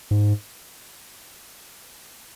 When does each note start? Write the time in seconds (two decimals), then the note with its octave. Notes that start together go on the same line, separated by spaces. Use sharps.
0.11 G#2